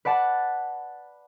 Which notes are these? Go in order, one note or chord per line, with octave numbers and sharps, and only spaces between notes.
B4 D5 F#5 A5